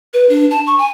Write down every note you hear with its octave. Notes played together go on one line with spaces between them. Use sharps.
B4
D4
A5
C#6
G#5